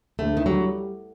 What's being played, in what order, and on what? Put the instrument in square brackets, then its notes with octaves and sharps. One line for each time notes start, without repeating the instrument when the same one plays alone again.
[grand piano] D2 [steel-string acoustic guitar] A3
[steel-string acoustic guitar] D#3
[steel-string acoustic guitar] F#3 [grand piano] G3